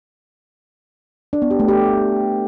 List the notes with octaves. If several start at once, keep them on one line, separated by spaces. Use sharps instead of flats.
D4
B3
G4
A3
G4